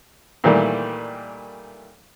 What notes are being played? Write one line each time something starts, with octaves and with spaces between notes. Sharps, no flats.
A#2 D#3 E3 G3 A3